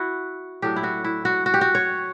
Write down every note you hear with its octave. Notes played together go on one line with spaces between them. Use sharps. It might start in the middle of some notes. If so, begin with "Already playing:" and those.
Already playing: E4 F#4
A2 F#3 A3 D4 G4
E4
F#4
E4
F#4
F#4
G4
F#4
C#5